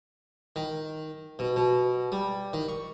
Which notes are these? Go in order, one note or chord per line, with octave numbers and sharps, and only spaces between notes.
D#3
B2
B2
G3
D#3
C#6